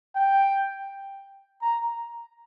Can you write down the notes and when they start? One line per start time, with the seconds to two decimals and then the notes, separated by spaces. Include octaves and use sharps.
0.16 G5
1.62 A#5